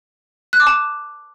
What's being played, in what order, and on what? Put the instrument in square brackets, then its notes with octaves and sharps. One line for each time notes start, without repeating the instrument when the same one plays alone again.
[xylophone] F#6
D6
A5